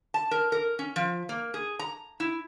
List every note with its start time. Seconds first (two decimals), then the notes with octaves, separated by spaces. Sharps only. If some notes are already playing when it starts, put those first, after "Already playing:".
0.14 A5
0.31 A#4
0.52 A#4
0.79 C#4
0.96 F3
1.29 A#3
1.54 G#4
1.79 A#5
2.20 E4